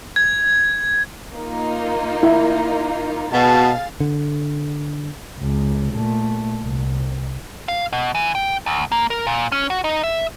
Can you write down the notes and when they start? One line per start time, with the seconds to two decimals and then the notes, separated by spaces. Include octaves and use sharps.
0.16 G#6
1.34 A#3 D#4 F4
2.23 E4
3.33 B2 G#4 F5 A5 A6
4.00 D3
5.38 C#2
5.93 A#2 A3
6.62 C2
7.68 F5
7.93 B2
8.15 E3
8.35 G5
8.66 D2
8.92 A#3
9.10 A#4
9.27 A#2
9.52 C#4
9.70 F#4
9.84 D#4
10.03 E5